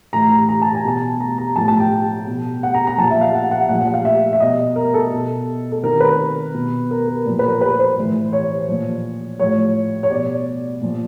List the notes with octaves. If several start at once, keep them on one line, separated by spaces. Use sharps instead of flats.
A2 E3 A#5
A#5
A#5
A5
G#5
B2 A5
A#5
A#5
A2 F3 A5
A5
G5
B2
F#5
A#5
A#5
A#2 F3 A5
E5
F5
F#5
F#5
A#2 F3 F#5
F#5
F5
E5
E5
B2 D#5
A#4
A4
B2
A4
C3 D#3 A#4
B4
B2
A#4
A#4
A#2 F3
B4
A#4
B4
C5
A2 E3
C#5
A#2 F3
A2 F3 C#5
C#5
B2 D5
A#2 F3